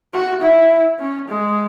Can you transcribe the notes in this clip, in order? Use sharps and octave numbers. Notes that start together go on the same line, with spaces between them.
F#4
E4
C#4
G#3